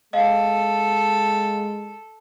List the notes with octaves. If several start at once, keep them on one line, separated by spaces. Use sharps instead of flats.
G#3 A4 D#5 F5